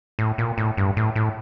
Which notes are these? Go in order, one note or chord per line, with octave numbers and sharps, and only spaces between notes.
A2
A#2
A2
G2
A2
A2